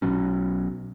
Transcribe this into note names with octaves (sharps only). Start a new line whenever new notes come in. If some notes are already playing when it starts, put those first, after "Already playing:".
B1 B2 F#3 C#4